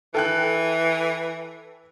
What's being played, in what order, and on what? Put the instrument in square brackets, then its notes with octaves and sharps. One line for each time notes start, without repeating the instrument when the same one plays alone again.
[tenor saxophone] E3 [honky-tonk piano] A4 G5 F#6